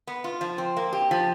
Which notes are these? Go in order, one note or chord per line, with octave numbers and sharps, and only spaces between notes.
B3
F4
F3
C4
A#3
G4
F3